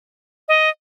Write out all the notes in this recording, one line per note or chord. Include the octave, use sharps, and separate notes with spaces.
D#5